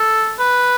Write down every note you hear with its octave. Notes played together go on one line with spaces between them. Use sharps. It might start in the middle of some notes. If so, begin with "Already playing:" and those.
Already playing: A4
B4